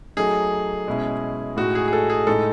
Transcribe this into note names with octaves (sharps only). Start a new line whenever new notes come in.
F#3 A3 D#4 G#4
B2 G#3 C#4 E4
A2 G#3 D#4 F#4
G#4
G#4
A4
G#4
A2 G#3 D#4 A4